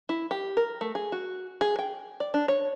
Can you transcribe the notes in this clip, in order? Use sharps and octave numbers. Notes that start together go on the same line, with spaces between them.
E4
G4
A#4
A3
G#4
F#4
G#4
G5
D5
D4
C#5